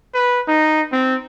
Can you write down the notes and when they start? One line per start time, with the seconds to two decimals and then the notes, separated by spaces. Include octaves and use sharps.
0.14 B4
0.48 D#4
0.92 C4